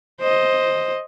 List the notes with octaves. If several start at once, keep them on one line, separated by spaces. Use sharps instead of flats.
C5 D#5